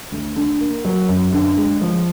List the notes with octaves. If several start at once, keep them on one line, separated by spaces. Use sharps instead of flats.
D2
D3
A#3
F#3
F#2
D3
G#3
F3